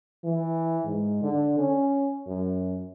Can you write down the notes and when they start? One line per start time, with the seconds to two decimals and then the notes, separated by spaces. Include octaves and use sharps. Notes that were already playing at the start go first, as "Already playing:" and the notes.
0.24 E3
0.84 G#2
1.22 D3
1.58 C#4
2.27 F#2